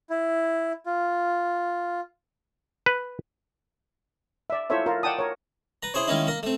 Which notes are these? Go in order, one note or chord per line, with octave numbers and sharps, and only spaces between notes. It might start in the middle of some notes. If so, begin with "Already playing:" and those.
E4
F4
B4
D5 E5
E4 F4 A4 C5 C#5 E5
F4 A#4
D5 F#5 G5 A5 D#6
A#4 C#5
B4 A#5
E4 G#4 C5 C#5
D#3 G#3 A#3 C#4 D#4 E4
A#3 A#4
A3 C4